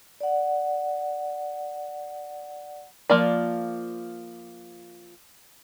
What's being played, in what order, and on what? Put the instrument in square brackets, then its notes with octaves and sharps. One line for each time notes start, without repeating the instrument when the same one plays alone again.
[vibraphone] D5 F#5
[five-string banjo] F3 A#3 F4 D5